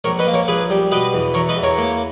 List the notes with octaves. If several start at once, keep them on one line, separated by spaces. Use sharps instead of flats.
A#1 A#4 C#5
B4 D#5
A#3
A#4 C#5
A#1 G#4 B4
G3
B2 B4 D#5
E2
E2 A#4 C#5
B4 D#5
E2
A#4 C#5
A#3